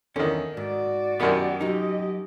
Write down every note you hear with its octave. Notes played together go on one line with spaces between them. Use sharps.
E2 D3 D#3 C#4
G#2 F#4 D5
F#2 D#3 B3 G4 F#5
F#3 D#4 G4 D#5